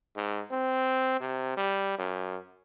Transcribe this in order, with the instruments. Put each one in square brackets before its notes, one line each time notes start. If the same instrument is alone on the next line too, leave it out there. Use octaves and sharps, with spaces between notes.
[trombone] G#2
C4
C3
G3
F#2